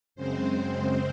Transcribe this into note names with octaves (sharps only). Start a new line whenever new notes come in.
F#2 C#3 G#3 C4 C5